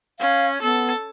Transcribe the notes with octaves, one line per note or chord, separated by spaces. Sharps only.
C#4 F5
B3 A4